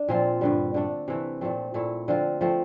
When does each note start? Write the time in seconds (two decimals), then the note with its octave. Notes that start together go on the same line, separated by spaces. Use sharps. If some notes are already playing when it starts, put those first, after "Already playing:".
Already playing: D4
0.08 A#2 F3 C4 F4
0.41 G2 D3 G3
0.74 D3 A3 D4
1.08 C3 E3 A3
1.41 A#2 F3 A3 C4
1.74 A#2 A3 E4
2.08 D3 F3 C4 F4
2.41 F3 A3 C4